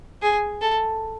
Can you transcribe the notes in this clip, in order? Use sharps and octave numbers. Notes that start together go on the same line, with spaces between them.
G#4
A4